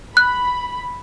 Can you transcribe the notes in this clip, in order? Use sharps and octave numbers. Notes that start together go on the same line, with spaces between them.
B5 F#6